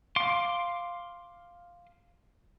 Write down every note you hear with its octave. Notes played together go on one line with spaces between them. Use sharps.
F5 C6 D6